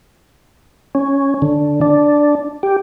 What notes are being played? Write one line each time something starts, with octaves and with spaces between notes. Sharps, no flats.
C#4
D3
D4
G4